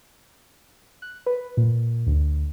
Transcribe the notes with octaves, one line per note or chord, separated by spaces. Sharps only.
F#6
B4
A#2
D2